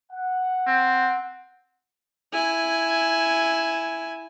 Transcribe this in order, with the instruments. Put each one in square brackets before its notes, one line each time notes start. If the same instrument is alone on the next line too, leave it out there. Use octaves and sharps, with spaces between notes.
[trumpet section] F#5
[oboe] C4
[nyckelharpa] E4 G#5